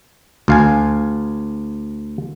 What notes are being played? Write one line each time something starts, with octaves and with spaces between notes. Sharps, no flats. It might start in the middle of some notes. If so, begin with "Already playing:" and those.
D2 F5 G#5